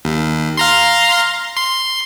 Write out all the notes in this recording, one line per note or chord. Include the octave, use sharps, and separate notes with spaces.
D#2
F5 A#5 C6
C6